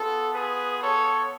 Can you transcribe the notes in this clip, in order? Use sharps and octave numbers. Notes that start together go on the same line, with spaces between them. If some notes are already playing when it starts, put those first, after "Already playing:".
Already playing: B3 F4 A4
G#4 B4
A4 C#5